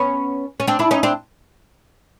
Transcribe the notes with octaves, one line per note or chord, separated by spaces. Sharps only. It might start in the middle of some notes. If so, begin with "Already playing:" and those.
Already playing: B3 C#4
C#4
C4 D4
D4 E4
C#4 D#4
C4 D4